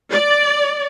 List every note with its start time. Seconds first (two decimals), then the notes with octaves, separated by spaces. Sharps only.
0.11 D5